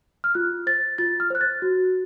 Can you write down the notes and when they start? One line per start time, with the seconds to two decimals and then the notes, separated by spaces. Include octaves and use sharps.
0.24 F6
0.35 F4 F#6
0.67 C5 A6
0.98 F4 A6
1.20 F6
1.30 C5 F#6
1.41 A6
1.62 F#4